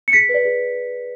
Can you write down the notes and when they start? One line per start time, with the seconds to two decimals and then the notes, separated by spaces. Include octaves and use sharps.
0.08 C#7
0.13 G#4 B6
0.29 B4 D5
0.45 G#4